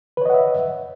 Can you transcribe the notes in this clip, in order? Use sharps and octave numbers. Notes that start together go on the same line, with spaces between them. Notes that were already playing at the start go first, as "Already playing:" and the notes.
B4 C#5 D#5 E5 F#5